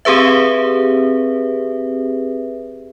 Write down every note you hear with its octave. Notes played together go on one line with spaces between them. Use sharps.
C4 G4 G#4 B4 E5